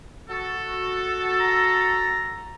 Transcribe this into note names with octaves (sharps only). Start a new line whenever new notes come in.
F#4 A4
A#5